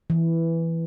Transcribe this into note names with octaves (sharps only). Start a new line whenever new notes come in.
E3